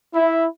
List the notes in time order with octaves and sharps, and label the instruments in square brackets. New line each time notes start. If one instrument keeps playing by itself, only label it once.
[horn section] E4